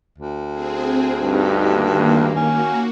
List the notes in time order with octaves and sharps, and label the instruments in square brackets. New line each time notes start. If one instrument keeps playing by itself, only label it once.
[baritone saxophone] D2
[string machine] C4 G#4
[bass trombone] G2 [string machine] D#4 G4
[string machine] D#3 A#3
[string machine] A#3 F#4 [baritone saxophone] C#4